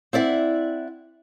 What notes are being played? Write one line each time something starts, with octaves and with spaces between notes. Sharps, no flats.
C4 E4 D5 E5 F#5